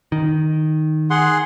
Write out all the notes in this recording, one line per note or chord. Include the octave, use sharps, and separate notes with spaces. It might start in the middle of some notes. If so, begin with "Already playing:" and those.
D#3
G#4 F#5 C6